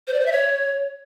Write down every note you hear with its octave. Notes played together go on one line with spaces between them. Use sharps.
C5
D5
C5
E5
C#5